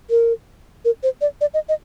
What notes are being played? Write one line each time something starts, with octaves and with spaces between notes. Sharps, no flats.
A#4
A#4
C5
D5
D5
D#5
D#5